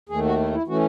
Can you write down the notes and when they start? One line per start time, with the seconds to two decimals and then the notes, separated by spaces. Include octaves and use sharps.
0.09 D#2 D#3 A3 G#4
0.25 F#4
0.39 E4
0.52 E4
0.67 E3 A3 C#4 F#4